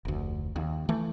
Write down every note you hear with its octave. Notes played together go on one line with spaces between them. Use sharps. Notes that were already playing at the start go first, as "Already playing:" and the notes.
F1 D2
D#2
E3 A3